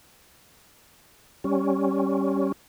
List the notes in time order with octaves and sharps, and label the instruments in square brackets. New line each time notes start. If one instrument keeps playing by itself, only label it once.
[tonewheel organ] G3 C#4